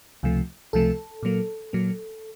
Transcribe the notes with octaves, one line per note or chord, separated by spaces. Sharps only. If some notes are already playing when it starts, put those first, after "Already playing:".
C#2 C3 F3 A3
C#2 C3 F3 A3 A4
A#2 F#3 A#3
A#2 F#3 A#3